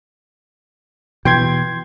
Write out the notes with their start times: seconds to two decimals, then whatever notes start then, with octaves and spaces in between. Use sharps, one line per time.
1.25 B2 E3 G5 C6 G#6